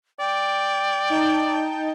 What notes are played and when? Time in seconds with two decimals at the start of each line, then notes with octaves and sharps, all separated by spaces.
0.19 D5 G5
1.10 D#4 A5 G6